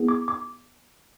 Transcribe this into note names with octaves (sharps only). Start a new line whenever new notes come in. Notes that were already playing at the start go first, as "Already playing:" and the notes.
Already playing: B3 E4 G#4
D6
D6